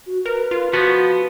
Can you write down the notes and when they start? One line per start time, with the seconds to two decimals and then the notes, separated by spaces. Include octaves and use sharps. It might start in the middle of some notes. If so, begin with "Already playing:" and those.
0.06 F#4
0.26 A#4 B4
0.51 F4
0.73 F3 B3 F#4